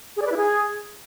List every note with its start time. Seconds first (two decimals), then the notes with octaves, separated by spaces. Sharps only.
0.16 G#4
0.22 D5
0.27 B4
0.32 E4
0.37 G#4